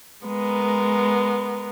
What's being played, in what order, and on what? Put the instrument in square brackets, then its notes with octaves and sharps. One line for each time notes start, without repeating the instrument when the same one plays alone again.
[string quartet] G#3 B3 A#4